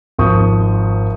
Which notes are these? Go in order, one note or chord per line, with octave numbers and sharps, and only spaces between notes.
G#1 F3 C#6 D#6 G6